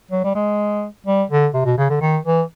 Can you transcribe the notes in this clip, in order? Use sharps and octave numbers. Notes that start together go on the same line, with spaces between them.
F#3
G3
G#3
G3
D3
C3
B2
C#3
D3
D#3
E3